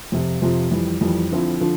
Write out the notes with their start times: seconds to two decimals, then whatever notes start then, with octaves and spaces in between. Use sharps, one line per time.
0.12 F2 C3 F3
0.42 F2 C3 F3
0.71 F2 E3 G3
1.01 F2 E3 G3
1.31 D3 F3 C4 E4
1.60 D3 F3